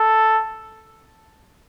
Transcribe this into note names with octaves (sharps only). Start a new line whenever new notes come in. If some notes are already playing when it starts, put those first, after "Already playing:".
Already playing: A4